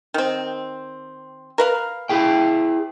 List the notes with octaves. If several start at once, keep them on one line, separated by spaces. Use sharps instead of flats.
D#3 C4
A#4 B4 F5
E4 G#4 G5